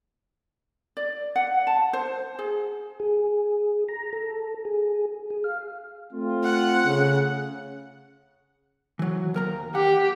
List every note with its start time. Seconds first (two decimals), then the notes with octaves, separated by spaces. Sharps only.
0.97 D5
1.36 F#5
1.67 A5
1.93 C5
2.39 G#4
3.00 G#4
3.89 A#5
4.13 A4
4.65 G#4
5.30 G#4
5.44 F5
6.13 A3 C4 F4
6.43 F#5
6.85 C#3
8.99 E3 F#3
9.34 D#2 A#4 A#5
9.75 G4 F#5